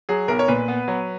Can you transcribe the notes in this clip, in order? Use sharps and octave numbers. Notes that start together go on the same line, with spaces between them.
F#3 G#4
B1 A#4
C#5
A#2 B4
B3
F#3